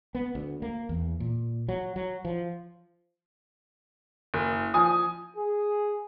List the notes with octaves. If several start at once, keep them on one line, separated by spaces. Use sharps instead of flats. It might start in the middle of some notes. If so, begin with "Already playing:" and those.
B3
D2
A#3
E2
A#2
F#3
F#3
F3
F#1
F3 G#5 D#6
G#4